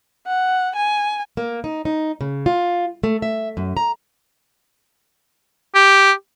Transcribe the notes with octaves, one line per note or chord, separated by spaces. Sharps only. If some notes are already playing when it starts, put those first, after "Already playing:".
F#5
G#5
A#3
D#4
D#4
C#3
F4
A3
E5
F#2
A#5
G4